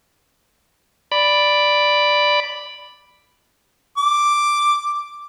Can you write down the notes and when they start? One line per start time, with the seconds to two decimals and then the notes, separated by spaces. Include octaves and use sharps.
1.12 D5 B5
3.98 D6